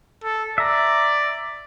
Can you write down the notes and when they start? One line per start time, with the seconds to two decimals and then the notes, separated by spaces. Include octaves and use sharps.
0.24 A4
0.58 D5 E5 A#5